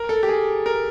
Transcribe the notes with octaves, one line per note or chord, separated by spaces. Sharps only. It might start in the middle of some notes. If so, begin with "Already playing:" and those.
Already playing: A#4
A4
G4
G#4
A#4